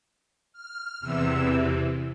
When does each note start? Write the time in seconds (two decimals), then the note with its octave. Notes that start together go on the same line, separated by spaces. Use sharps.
0.53 F6
1.00 E2 C3 E3 E6